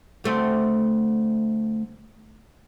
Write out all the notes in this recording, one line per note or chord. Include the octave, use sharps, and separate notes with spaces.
D2 A3 C4